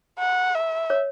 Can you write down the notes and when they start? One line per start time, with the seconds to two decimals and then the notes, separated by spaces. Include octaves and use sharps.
0.19 F#5
0.55 E5
0.90 C#5